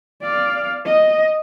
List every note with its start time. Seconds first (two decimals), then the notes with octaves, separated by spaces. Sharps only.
0.22 D5 F5
0.85 D#5